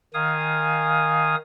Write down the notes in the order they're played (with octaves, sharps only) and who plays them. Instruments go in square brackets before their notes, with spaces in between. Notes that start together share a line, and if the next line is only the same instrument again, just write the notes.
[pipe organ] D#3 F5 G#5 D#6